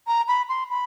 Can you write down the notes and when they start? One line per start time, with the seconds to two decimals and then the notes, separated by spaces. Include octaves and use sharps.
0.07 A#5
0.28 B5
0.49 C6
0.70 B5